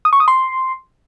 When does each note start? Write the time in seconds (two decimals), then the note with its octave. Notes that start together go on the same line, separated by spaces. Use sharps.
0.05 D#6
0.13 C#6
0.20 D#6
0.28 C6